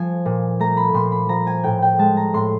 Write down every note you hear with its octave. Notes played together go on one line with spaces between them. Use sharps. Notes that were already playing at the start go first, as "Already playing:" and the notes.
Already playing: F3 G#5
A#2
A3 A#5
B5
A#2 C6
B5
F3 A#5
G#5
A2 G5
G5
G#3 A5
A#5
A2 C6